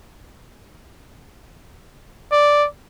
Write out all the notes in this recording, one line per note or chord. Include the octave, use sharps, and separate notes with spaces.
D5